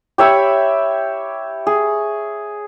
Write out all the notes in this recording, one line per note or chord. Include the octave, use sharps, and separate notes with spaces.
G4 C#5 E5 B5
G#4